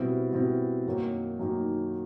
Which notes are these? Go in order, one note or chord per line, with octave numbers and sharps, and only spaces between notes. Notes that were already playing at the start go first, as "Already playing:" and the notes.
Already playing: B2 G3 C4 E4
B2 G3 C4 E4
F#2 D#3 F#3 A#3 D#4
F#2 D#3 F#3 A#3 D#4